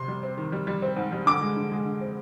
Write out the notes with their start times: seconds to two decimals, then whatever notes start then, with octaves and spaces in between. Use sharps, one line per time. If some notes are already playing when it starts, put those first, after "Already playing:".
Already playing: C3 C6
0.08 G3
0.23 C4
0.38 D#3
0.52 G3
0.67 G3
0.82 C4
0.96 G#2
1.12 G3
1.26 D3 D6
1.41 G#3
1.56 D3
1.72 G#3
1.85 D3
2.01 C4